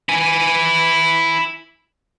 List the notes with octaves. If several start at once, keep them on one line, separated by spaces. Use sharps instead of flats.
E4 G#5